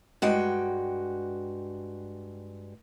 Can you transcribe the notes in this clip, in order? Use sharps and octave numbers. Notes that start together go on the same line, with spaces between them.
G2 G#3 F#4 G5